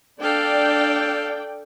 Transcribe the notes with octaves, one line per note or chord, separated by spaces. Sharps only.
D4 A4 D5 F5 G5